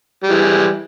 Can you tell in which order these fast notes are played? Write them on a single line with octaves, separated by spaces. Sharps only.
G3 G#3 E3